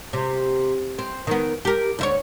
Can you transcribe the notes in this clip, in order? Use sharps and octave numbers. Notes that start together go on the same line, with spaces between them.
C3
C4
D#3 B3
G4 A#4
D2 E4 C#5